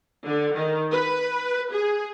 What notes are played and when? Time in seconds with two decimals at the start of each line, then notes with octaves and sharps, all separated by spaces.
0.25 D3
0.55 D#3
0.91 B4
1.72 G#4